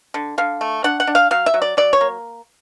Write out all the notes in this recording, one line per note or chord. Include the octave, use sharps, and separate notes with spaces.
D3
D3 F5
A3
D4 F#5
F#5
D4
F5
F#3 F5
E5
F#3
D5
F#3 D5
C#5
A#3